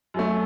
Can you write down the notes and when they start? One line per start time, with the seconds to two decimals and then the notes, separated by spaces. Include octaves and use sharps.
0.14 F#2 F#3 A3